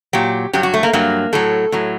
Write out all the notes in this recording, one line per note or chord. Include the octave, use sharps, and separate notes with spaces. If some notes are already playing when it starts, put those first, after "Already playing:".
A#2 F#3 G4
G2 F#3 G4
F#4
A3
A#3
G2 F#3 A#3
A2 F#3 A4
A2 F#3